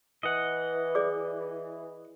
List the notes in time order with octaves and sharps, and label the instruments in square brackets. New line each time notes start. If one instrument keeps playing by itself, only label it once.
[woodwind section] E3 [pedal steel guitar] D#5 F#5
[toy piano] G#4 D5 D6